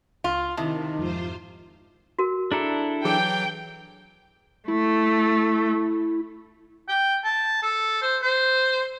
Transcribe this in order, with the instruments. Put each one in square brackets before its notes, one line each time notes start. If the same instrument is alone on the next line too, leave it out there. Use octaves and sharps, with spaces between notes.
[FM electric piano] C#2 [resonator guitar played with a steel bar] F4
[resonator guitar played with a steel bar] C3 [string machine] D#3 [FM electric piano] E4 D#5 A5
[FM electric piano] F2 G#2 [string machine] F4 C5
[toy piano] F#4 A#4
[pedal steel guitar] D4 E4 A4 [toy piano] G#4 A#5
[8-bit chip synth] E3 F#3 [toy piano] G#4 [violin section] G5
[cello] A3 [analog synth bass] E4
[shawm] G5
A5
A4
C5
C5